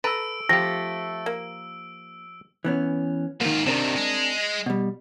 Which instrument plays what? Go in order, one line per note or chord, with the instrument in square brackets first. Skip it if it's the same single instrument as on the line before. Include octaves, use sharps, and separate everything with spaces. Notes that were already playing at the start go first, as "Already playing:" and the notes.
[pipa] A4 A#5 [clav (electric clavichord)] B4 [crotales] E6 D7
[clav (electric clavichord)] F3 G4 [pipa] A3 C4 F4 [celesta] A#6
[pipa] A#3
[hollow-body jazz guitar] E3 B3 C#4
[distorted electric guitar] G#2 F4 [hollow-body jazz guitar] D#3 A#3
[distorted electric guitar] C3 D#3 [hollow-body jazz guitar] C4 D4 A#4
[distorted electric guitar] G#3
[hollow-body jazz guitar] B2 G3